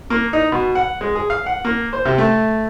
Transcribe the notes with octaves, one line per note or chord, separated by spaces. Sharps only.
A#3
D#4
B2
F#5
G#3
G#4
F5
F#5
A#3
C5
C3
A3